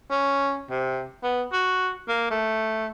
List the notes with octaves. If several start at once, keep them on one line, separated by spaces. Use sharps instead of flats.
C#4
C3
B3
F#4
A#3
A3